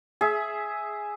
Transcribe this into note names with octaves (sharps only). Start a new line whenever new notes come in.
G#4 E5